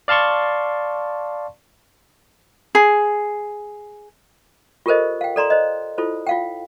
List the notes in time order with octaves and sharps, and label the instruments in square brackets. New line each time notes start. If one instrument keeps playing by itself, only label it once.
[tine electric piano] D5 F5 A5 C6 C#6
[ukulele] G#4
[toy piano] F4 G4 A4 A#4 C5 D#5
F5 G5
A4 D5 A#5 C6
C5 D#5
E4 F4 A4 C5
F4 F5 G5